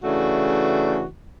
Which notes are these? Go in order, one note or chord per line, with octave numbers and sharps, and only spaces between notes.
C#3 E3 A3 D4 F#4